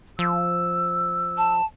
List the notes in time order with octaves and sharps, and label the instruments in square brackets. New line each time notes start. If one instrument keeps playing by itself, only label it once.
[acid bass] F3 [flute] E6
[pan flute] A5